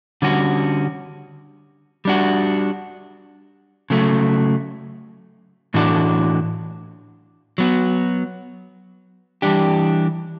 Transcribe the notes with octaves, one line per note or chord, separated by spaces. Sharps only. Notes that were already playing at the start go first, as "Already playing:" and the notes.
D3 G3 C#4 F#4
G3 D4 F#4
C#3 F#3 A3
A2 E3 A3 D4 F#4
F#3 B3 F#4
E3 G3 D4 G4